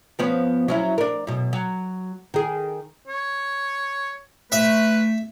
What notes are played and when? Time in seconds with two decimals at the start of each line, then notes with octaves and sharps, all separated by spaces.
0.19 F3 B3 C#4
0.68 F#3 C#4 E4
0.98 D4 A#4
1.27 F#2 B2
1.53 F#3
2.34 D#3 G#4
3.08 C#5
4.52 A3 B4 E5